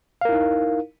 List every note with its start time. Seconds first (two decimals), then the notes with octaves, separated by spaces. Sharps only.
0.21 F5
0.25 A#4
0.29 E4
0.33 D#4